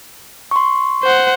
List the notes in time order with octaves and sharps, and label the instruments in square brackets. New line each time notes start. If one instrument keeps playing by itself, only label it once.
[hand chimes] C6 C#6
[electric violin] C5 F#5